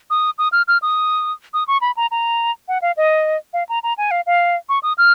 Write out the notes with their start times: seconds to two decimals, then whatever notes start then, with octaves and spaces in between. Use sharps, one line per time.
0.10 D#6
0.38 D#6
0.52 F6
0.68 F6
0.82 D#6
1.54 D#6
1.68 C#6
1.81 B5
1.97 A#5
2.11 A#5
2.68 F#5
2.82 F5
2.97 D#5
3.53 F5
3.69 A#5
3.83 A#5
3.98 G#5
4.11 F5
4.26 F5
4.69 C#6
4.83 D#6
4.98 F6